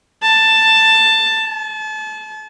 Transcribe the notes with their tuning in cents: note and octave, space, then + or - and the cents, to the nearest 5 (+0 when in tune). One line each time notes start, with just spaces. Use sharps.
A5 +10
A5 -30